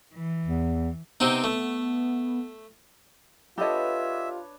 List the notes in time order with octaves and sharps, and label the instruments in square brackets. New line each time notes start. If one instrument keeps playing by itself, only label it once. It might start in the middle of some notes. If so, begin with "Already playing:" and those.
[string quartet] E3
[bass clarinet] E2
[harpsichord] C3 C4 D#4 [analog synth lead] B3
[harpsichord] A3
[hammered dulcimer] D4 B4 C#5 [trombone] F4 [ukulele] G4 A4 D#5 [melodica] E5